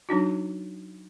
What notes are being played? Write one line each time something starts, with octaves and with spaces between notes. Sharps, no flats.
F#3 D4 D#4 F#4